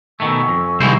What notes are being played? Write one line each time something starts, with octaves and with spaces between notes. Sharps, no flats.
B2 D#3 A3 G#5 C#6 E6
F2
C2 D#3 G#3 C5